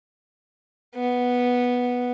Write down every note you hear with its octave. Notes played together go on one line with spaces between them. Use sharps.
B3